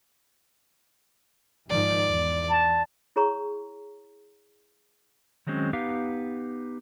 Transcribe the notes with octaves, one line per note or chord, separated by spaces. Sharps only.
G#2 D#3 F3 D5
E2
A5
E4 G#4 C#5 A#5 C6 C#6
D#3 F#3 G#3 C4 C#4
B3 D#4 G4 B4 F5